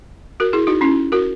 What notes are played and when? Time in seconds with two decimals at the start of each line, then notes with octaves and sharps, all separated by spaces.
0.40 F#4 A#4
0.53 E4 G#4
0.67 D#4 F#4
0.81 C#4 E4
1.12 F#4 A#4